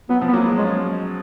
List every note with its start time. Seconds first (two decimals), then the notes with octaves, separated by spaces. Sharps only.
0.09 F#3 B3
0.21 F3
0.29 B3
0.33 F#3 A#3
0.45 G#3
0.58 G#3 C#4